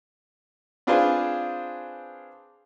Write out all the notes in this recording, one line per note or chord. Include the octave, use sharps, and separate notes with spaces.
C4 D4 F4 G#4 B4 C5